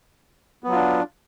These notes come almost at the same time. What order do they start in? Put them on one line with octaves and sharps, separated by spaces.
B3 F#3 F4 D4